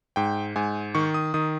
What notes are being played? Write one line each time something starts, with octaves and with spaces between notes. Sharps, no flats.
G#2 G5
G#2 G#5
D#3 C#6
D#6
D#3 D#6